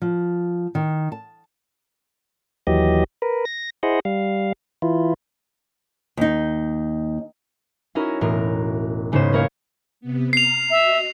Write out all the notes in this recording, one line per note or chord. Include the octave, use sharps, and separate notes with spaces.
F3
D#3
A5
D#2 E3 F#3 G4 D#5
A#4 B4
A#6
E4 G#4 C5 D#5 F#5
G3 F5
E3 E4 F4
D#2 D#4
C#4 D#4 E4 F#4 A#4
E1 A2 A#4
G#2 C#3 B3 C#4 C5 E7
A#3 E4 A#4 C5 C#5 F5
C3 B3
A#5 F6 C7 F7
F#4 D#5 E5 E6